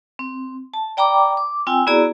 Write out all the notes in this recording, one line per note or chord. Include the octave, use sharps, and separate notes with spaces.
C4
A5
D5 G5 A#5 B5 D6
D6
C4 F4 G5 G#5 E6
B3 E4 F#4 G#4 D5 A#5